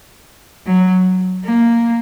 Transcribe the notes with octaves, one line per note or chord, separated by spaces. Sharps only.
F#3
A#3